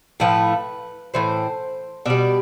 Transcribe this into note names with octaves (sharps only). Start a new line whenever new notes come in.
A2 F3 A3 B4
A2 E3 C5
B2 G3 D5